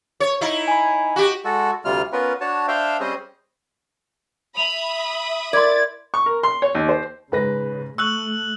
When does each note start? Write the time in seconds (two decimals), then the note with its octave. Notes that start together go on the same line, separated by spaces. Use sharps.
0.20 C#5
0.41 D#4 E4
0.68 G#5 B5
1.16 F#4 G4
1.45 G#3 F#4 A4
1.85 D2 C3 G3 F4 F6
2.12 B3 C#4 F4 A#4 B4
2.40 D4 F#4 C#5 A5
2.68 D4 C5 E5 F5 G5
3.00 G3 C4 C#4 G#4 C5 D#5
4.57 E5 B5 D#6 F7
5.53 E4 A#4 D5 C6 G#6 A6
6.14 C#6
6.26 A#4
6.43 C6
6.62 C#5
6.75 D#2
6.89 C5
7.32 G#2 C#3 B4 A#6
7.98 A3 C#6 E6 F#6 F#7